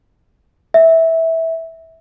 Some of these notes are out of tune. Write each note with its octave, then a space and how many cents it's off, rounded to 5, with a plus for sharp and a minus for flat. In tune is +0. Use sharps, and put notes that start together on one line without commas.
E5 -15